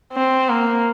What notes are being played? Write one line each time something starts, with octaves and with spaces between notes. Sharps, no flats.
C4
A#3